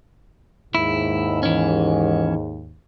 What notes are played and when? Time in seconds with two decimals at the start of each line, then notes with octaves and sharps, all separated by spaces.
0.75 D#2 G#2 E4
1.43 E3 C#4